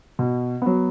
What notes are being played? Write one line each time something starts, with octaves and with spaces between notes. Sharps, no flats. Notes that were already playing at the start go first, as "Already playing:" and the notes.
B2
F#3 B3